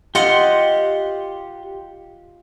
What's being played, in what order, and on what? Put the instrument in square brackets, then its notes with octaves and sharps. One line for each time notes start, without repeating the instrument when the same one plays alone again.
[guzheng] F4 D#5 F#5 [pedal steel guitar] G4 C6